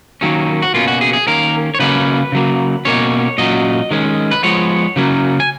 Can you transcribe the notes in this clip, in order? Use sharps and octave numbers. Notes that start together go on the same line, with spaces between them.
D#3 F#3 A#3 C#4
F#4
B2 A#3 C#4 F4
F#4
G#4
G#4
D#3 A#3 C#4 A#4
C#5
C#3 F#3 A#3 C#4 B4
C#3 F#3 A#3
B2 A#3 C#4 C#5
A#2 F#3 C#4 D#5
D#3 G#3 C#4
B4
F3 G#3 B3 C#5
C#3 F#3 A#3 C#4
G#5